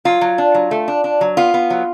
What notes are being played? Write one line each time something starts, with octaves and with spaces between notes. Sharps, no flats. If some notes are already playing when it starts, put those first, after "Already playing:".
F#3 F4
F#3
D4
F#3
A3
D4
D4
F#3
B3 F4
B3
F#3